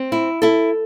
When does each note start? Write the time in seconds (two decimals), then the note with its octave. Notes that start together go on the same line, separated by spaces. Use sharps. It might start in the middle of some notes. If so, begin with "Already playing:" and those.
Already playing: C4
0.12 E4
0.42 E4 A4